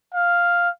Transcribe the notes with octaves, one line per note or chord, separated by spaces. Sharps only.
F5